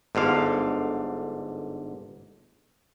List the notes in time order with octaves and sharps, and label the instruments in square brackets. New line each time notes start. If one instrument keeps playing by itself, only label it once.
[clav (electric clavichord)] G1 G#2 D3 F5